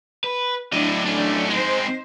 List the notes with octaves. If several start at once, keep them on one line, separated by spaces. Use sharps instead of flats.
B4
A2 F#3 D4 E4 D#5
A3 C#4
G#3 C4 D#4 C5